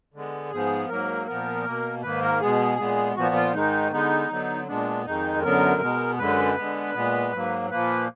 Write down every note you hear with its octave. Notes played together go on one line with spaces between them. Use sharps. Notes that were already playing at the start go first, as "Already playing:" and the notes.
D3 G#3 B3
G#2 F3 B3 G#4
G#2 F#3 A#3 A#4
A#2 F3 B3 A#4
B2 A#3
G#2 D#3 A#3 B4
A#4
B2 G#3 B3 G#4
A#2 G#3 B3
A#2 F3 B3 F#4
F4
G#2 D#3 G#3 D#4
D3 G#3 B3 D#4
D3 F#3 B3
A#2 G#3 B3 D4
F2 D#3 G#3 D#4
F#2 D3 F#3 B3 A#4
B2 G#3 B3
F#2 D3 G#3 B4
D3 G#3 B3
A#2 G#3 B3
G#2 F#3 A#3
A#2 F3 A#3 B4